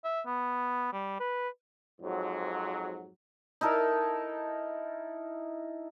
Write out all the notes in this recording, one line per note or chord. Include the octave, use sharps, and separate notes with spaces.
E5
B3
G3
B4
F2 G#2 F#3
D#4 E4 A4 A#4